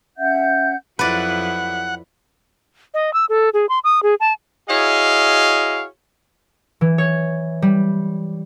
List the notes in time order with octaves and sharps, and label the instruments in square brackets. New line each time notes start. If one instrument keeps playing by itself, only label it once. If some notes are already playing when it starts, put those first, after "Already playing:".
[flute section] C#4 E5 F#5 G6
[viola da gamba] F2 F#3 E4 [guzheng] B4 D5 [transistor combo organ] F#5
[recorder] D#5
E6
A4
G#4
C6
D#6
G#4
A5
[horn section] E4 F#4 G#4 C#5 D#5 F5
[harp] E3
C#5
G3